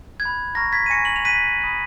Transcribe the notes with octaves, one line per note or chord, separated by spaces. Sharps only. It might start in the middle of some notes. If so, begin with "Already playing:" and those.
F#6 G#6
B5
A#5 C#6 F6 A#6
G#6 B6
D#7
G#5 C#6 F6 A#6 C#7
F#7
F7
G#5 C#6 F#6 B6 D#7
B5 D#6 F#6